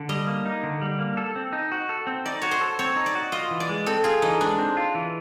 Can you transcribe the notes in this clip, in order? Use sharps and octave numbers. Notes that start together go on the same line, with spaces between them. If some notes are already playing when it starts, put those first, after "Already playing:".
Already playing: D3
G3 D#5
A#3
D#4
D3
G3
A#3
A4
C4
D#4
F#4
A4
C4
D#4 D5
F#4 C#5
C5
A4
C4 C#5
D#4
D5
F#4
F4 D#5
E3
D5
G#3
C4 A4
F4 G#4
E3 D#4
G#3 D4
C4
F4
E3